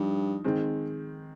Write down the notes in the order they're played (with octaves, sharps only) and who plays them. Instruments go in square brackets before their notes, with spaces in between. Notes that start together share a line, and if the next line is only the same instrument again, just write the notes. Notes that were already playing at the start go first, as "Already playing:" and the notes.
Already playing: [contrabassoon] G2 [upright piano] F3 D#4
[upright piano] D#3 G#3 C4